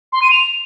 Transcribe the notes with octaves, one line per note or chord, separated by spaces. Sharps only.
C6
D#7
F7